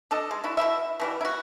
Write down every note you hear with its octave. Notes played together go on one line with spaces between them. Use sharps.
D4 A4 D#5
G#3
D4 E4 F#4
B2 A3 E4 E5
B2 E3 G3
E4 F#4